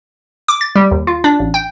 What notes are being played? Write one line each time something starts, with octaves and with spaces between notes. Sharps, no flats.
D6
A6
G3
D#2
F4
D4
A1
G5